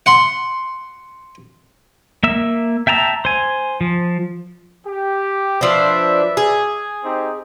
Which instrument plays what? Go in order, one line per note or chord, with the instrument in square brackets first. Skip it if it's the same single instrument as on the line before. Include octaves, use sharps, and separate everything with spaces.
[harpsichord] F#5 C6
[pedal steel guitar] A#3 E5 E6
E5 G5 A5 A#5 E6
C5 G#5
F3
[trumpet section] G4
[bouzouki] F3 D4 [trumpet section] B4 D5 E5
[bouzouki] G#4
[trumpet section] C4 D#4 G4